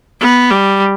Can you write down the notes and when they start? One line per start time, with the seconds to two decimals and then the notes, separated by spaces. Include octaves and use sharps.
0.21 B3
0.51 G3